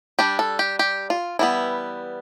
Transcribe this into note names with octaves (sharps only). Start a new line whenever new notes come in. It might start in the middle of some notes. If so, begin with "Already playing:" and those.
G3 D4 G4
A4
G4
G4
F4
E3 G3 B3 E4